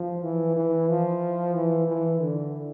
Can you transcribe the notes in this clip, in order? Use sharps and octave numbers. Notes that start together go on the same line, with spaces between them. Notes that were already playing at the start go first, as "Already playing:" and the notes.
Already playing: F3
E3
E3
F3
E3
E3
D3